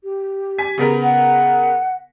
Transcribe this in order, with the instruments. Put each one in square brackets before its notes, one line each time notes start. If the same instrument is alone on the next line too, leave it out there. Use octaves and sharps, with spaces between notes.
[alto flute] G4
[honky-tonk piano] G#5 B6
C#3 B3 A#4
[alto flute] F#5